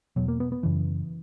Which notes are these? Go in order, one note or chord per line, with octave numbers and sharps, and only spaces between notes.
E2 B2 F#3
A#3
B3
B3
F#2 C#3 E3